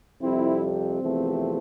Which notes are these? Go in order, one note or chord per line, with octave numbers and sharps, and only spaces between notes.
F2 C3 G3 C4 E4
C4
E2 C3 F3 A3